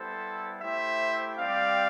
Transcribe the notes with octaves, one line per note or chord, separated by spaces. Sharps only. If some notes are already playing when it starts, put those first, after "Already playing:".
Already playing: G3 B3 E4 A4 C5
A3 E4 G4 C5 E5
G3 C4 G4 D5 F5